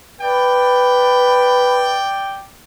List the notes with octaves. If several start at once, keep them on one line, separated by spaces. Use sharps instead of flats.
B4 D5 G5